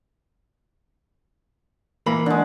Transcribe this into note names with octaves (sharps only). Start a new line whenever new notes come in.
E3 A#3 B5
D3 G#3